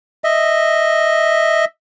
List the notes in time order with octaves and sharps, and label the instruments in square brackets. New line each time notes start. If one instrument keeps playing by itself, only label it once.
[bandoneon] D#5 E5